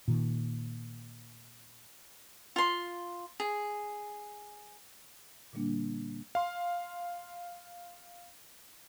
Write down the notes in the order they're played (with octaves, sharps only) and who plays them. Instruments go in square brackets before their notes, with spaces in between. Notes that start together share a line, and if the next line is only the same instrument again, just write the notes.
[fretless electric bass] A#2 D#3
[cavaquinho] F4 C6
G#4
[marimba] A#2 D3 G3 A#3 D4
[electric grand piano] F5 C6